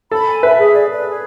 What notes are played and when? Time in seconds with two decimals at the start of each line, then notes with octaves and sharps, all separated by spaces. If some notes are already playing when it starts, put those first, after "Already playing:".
0.11 A4 B5
0.27 G#5
0.43 B4 E5
0.58 G#4
0.74 D5
0.90 B4
1.06 G#4